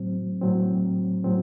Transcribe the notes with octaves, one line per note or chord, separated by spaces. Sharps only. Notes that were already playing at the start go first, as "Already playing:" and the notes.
Already playing: A2 F#3 C4
A2 F#3 C4
A2 F#3 C4